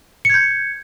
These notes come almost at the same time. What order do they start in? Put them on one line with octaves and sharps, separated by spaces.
C#7 G#6 G6